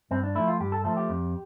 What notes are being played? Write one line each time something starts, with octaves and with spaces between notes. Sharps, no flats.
G2 C4
D4
F3 A3 E4
F4
G2 G4
A4
F3 A3 A4
G4
F2